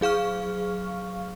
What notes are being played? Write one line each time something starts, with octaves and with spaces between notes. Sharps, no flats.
F#3 G#4 F5 C#6 F6